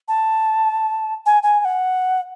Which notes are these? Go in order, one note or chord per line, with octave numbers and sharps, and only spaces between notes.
A5
G#5
G#5
G#5
F#5